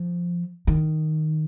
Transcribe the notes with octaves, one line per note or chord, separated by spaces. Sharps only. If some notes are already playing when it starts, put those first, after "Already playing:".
Already playing: F3
D#3